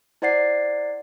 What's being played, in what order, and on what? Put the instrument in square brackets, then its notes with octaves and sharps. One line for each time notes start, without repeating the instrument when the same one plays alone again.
[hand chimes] E4 C5 D5 F#5 A6 C7